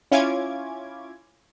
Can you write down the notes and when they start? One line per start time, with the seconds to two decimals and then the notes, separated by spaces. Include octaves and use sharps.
0.12 C#4 E4 F4 D6 G#6